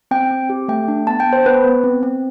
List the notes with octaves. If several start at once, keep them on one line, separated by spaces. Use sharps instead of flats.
C4 G5
C4
G4
A3 G5
D4
B3 A5
G5
B3
C5
B3 B4
B3
C4
C4